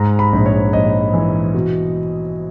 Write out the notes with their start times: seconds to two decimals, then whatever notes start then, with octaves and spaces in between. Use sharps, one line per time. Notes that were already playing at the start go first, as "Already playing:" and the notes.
Already playing: G#2 A#5
0.19 B5
0.33 A#1
0.46 C#5
0.73 A#1 D#5
1.14 E3
1.54 B2